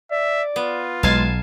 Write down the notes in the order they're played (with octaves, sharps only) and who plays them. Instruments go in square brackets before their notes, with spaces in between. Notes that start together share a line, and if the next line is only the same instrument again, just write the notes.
[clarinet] D5 [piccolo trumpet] E5
[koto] B3 [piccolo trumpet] F4
[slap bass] B1 [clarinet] G#3 [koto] F5 G#5 A5